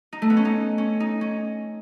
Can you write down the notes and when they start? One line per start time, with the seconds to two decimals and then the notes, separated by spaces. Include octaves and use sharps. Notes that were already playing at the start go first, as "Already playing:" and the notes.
0.13 D#4
0.22 A3
0.30 B3
0.37 C#4
0.45 D#4
0.78 C#4
1.00 D#4
1.21 C#4